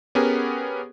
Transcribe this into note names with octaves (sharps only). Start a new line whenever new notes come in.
B3 C#4 G4 G#4 A#4